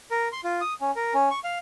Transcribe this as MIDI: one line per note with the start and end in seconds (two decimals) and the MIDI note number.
0.11 0.29 70
0.32 0.41 84
0.44 0.61 65
0.61 0.74 87
0.81 0.91 61
0.96 1.14 70
1.14 1.29 61
1.31 1.39 85
1.44 1.58 77